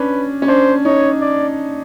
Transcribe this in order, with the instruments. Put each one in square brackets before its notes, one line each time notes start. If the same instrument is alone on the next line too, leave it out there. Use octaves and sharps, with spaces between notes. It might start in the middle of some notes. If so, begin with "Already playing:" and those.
Already playing: [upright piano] C#4 D4 [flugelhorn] B4
[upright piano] C#4
[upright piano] D4 [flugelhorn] C5
[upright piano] D#4 [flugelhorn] C#5
[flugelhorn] D5